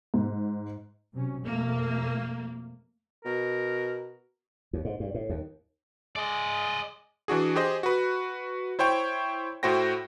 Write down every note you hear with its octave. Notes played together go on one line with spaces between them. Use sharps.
G#2
C3 F#3 C#4
F2 B2 A3 A#3
B2 A#4
D#2
G#2
G2
A2
D#2
G#3 D5 D#5
E3 D4 F#4 G#4
G4 G#4 C5 D#5
F#4 B4
E4 C5 C#5 G5 C#6
A2 E4 F#4 C5 G5 A#6